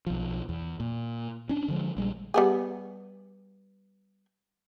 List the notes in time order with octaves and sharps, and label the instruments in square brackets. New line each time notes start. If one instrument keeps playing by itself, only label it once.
[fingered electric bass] B1 F3
E2
A#2
C#4 D4
D3 F3 G#3
A#1 G3 G#3
[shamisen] G3 B3 G#4